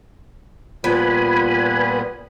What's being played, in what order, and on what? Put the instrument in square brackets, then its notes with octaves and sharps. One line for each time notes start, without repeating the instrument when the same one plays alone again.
[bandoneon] A#2 G3 B3 [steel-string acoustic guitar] F3 [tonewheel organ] B4 G#5 B5